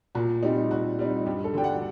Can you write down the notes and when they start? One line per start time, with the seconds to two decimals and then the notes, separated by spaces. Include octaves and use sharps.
0.15 A#2 F#4
0.43 G3 C4 D#4 G4
0.71 A#2 F#4
0.99 G3 C4 D#4
1.26 G2 G4
1.44 A4
1.54 D3 G3 D4 G5
1.64 F#5